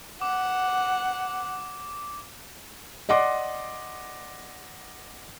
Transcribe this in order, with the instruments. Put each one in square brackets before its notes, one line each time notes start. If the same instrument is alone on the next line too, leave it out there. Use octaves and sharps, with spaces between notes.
[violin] F#5 [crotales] D6
[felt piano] D5 D#5 F#5 C6 D6